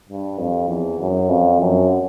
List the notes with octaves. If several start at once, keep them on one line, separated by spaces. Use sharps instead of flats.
G2
F2
E2
F#2
F2
F#2